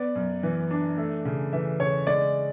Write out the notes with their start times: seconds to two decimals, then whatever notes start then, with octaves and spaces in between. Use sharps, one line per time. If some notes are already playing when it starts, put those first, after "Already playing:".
Already playing: B3 D5
0.15 F#2
0.43 E3
0.71 D4
0.97 A3
1.25 C#3
1.52 E3 E5
1.80 C#3 C#5
2.07 G#3 D5